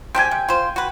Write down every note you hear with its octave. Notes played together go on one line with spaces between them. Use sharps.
C4 D4 G4 G5 G#5
C3
F4 C5
F#4 B4